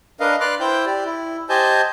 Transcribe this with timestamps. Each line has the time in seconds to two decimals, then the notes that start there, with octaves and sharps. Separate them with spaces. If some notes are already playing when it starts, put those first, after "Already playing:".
0.20 D4 A#4 B4 D#5 F5
0.40 B4 D5 C6 D6 F6 F#6
0.60 E4 C5 G5 G6
0.86 G4 D5
1.05 E4
1.49 G4 C5 D#5 G#5 A5 G6